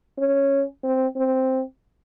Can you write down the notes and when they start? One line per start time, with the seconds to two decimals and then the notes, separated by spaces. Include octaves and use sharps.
0.19 C#4
0.84 C4
1.17 C4